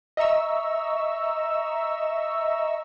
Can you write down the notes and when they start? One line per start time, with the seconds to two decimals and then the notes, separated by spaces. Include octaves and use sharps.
0.17 D#5 E5 A#5 C#6 E6